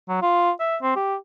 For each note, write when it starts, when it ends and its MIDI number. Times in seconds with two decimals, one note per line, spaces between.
0.09 0.20 54
0.22 0.51 65
0.60 0.77 76
0.82 0.93 60
0.96 1.16 67